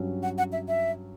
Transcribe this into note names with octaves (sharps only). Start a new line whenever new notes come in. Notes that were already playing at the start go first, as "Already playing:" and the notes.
Already playing: G2 F#3 C#4
F#5
F#5
E5
E5